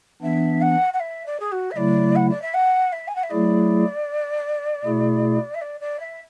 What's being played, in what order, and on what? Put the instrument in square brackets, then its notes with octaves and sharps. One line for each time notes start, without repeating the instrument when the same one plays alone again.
[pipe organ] E3 B3 D4 [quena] E5
[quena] F#5
F#5
E5
D5
G#4
F#4
E5
[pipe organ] C#3 F#3 A3 E4 [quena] D5
[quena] F#5
D5
E5
F#5
E5
G#5
F#5
E5
[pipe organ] F#3 A3 E4 G#4 [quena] D5
[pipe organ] B2 A3 E4 G#4
[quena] E5
D5
D5
E5